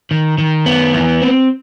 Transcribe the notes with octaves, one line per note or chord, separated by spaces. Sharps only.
D#3
D#3
B3
E3
C4